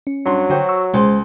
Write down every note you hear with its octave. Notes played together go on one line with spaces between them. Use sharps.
C#4
G2 F#3 C6
D3 F#4 C5 G5
C#6 E6
C#2 G#3 C5 C6